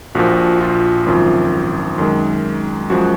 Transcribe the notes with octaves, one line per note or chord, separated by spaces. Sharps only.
A#1 A#2 F3 F#4
F4
G#1 F#2 F3
F#2 D#3 G#3
F#2 F3 G#3 F#4